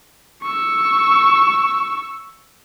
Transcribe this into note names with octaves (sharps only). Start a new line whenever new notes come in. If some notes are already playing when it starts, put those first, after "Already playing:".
C#6 E6